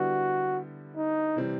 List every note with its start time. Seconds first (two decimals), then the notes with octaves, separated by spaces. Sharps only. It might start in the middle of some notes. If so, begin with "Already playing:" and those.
Already playing: D3 G3 B3 E4 F#4 G4
0.96 D#4
1.36 C3 E3 G3 C4